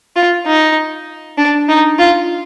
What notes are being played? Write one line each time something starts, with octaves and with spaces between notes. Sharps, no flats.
F4
D#4
D4
D#4
F4